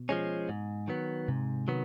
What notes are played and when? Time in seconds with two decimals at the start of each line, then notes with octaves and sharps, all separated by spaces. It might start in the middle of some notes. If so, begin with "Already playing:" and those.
Already playing: B2
0.09 F3 G#3 C#4
0.49 G#2
0.88 D#3 F#3 B3
1.28 G#2 C3
1.68 D#3 F#3 B3